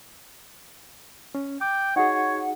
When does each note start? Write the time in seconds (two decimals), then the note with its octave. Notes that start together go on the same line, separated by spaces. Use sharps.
1.35 C#4
1.61 G5 D6
1.96 D#4 F#4 G#4 C#5 F#5